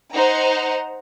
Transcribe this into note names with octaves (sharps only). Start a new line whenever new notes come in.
D#4 C5 F#5 A#5